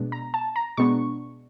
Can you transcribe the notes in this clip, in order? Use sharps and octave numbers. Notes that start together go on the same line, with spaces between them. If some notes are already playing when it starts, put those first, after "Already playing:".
Already playing: B2 G#3 B3 D4
A#5
A5
A#5
B2 G#3 B3 D4 C#6